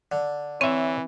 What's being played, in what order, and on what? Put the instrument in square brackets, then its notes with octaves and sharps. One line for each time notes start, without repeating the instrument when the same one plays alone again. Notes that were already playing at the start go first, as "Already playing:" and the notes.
[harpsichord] D3
[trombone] E3 [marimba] C4 [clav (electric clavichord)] C#5 E5